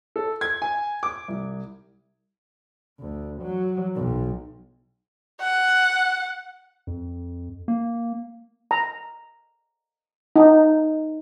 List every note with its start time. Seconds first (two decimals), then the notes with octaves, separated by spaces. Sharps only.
0.16 A4
0.41 G#6
0.62 G#5
1.03 D6
1.28 C2
2.99 D2
3.42 F#3
3.95 B1
5.41 F#5
6.87 F2
7.68 A#3
8.71 A#5
10.36 D#4